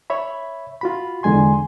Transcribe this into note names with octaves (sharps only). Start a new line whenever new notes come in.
C#5 E5 B5
F4 F#4 B5
E2 D3 G#3 G#5 C6